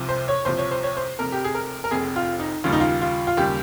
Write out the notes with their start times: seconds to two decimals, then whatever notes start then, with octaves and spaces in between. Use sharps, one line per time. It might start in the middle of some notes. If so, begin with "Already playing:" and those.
Already playing: C2 C3 F3
0.09 C5
0.28 C#5
0.45 C2 C3 F3 C5
0.58 C#5
0.71 C5
0.83 C#5
0.97 C5
1.19 F1 F2 C3 A#4
1.32 G4
1.44 G#4
1.55 A#4
1.84 A#4
1.91 F1 F2 C3 G#4
2.16 F4
2.40 D#4
2.64 D#2 C#3 G3 F4
2.72 D#4
2.80 F4
3.01 F4
3.27 F4
3.37 D#2 C#3 G3 G4